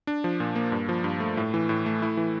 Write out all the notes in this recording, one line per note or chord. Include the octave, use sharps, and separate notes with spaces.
D4
F3
A#2
A#3
G2
F3
G2
A3
A2
E3
A2
A3
E4
E3